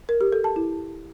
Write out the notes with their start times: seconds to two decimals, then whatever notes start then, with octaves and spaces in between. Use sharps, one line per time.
0.09 A#4
0.21 G4
0.32 A4
0.44 A5
0.56 E4